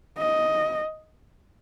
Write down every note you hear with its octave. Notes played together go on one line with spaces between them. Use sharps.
D#5